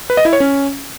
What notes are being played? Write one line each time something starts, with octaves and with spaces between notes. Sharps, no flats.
B4
D#5
E4
C#5
C#4